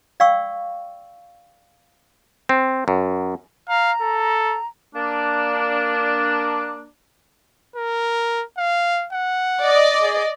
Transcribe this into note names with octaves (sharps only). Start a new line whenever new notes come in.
D5 F5 G5 C#6 E6
C4
F#2
F5 A#5
A4
A#3 D4
A#4
F5
F#5
D5 D#5
G#4